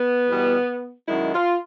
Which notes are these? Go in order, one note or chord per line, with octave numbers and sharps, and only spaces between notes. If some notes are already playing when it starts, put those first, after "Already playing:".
Already playing: B3
E2 B2 G3
F#2 D#3 G#3 E4
F4